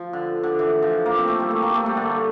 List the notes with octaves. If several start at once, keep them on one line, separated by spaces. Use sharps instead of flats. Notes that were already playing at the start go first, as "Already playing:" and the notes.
Already playing: F3
D3
D3
E3
F3
A#3
C4
A3
G3
A3
A#3
A3
G3
D3